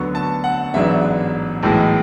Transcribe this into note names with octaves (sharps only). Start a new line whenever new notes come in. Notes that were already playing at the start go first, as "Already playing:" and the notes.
Already playing: D2 D3 F#3 B3 C#6
A5
F#5
A1 G#2 F#3 B3 D4 E5
B1 A2 E3 G#3